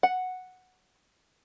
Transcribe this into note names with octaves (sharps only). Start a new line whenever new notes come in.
F#5